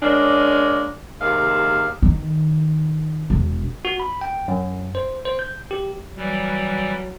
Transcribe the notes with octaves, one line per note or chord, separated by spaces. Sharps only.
G#3 A#3 C#4 D4
D#2 C3 G#3 F5
D#3
E1
F#4
B5
G5
F#2
C5
C5
G6
G4
E3 F#3 G3